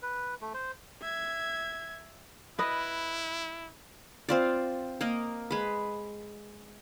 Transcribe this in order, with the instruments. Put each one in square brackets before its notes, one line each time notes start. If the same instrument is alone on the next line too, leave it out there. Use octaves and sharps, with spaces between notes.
[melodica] B4
A3
C5
[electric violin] E5 G#6
[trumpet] E4 [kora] B4 D#5
[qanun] C4 F4 D5
A#3 A#4 D#5
G#3 B4